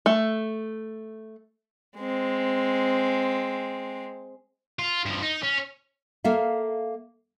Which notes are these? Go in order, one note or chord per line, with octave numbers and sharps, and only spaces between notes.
A3
G#3 C4
F4
G2 F3
D#4
C#4
A#3 A4 E5 F5